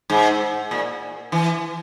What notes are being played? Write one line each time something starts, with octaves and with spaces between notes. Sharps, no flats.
G#2
A#2
E3